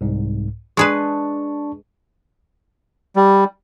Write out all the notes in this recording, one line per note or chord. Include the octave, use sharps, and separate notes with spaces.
C2 G#2
G#3 D4 G#4 B4 A5 C#6
G3